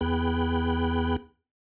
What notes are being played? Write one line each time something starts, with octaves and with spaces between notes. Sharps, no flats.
E2 B3 G#4 G5 B5 F#6